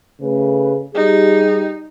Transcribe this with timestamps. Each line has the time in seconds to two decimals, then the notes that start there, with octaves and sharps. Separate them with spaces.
0.21 C#3 A3 B4
0.95 G3 D#4 G4 G#4